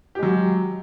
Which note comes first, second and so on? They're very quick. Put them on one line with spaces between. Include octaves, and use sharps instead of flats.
G4 G#3 F#3